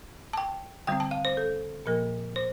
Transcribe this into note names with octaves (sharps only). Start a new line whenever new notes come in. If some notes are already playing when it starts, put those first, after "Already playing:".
A5
G5
D3 G3 C4 G5
A5
F5
C5
A4
A#2 F3 A#3 A#4
C5